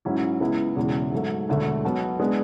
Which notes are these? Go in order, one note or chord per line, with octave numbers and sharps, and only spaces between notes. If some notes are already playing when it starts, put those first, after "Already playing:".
G#2 F#3 C#4 E4
C#2 C#3 G#3 B3 E4
E1 E2 C#3 E3
G#2 F#3 A3
E1 D2 D3 A3
B1 B2 F#3 B3
G#3 B3 D4 G#4